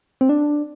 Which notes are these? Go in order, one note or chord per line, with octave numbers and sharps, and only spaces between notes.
C4
D4